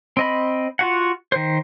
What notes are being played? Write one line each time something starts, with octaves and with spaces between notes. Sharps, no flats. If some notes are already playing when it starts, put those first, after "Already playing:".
C4 D#5 B5
F4 F#4 F#5
D#3 C5